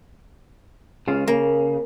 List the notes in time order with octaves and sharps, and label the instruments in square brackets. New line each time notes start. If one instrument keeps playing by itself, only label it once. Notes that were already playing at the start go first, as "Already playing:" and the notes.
[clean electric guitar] C#2 C#3 F4
[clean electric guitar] C#3 [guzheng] A#3